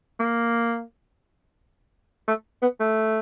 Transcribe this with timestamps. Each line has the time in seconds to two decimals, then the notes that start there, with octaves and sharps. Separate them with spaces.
0.19 A#3
2.28 A3
2.62 B3
2.80 A3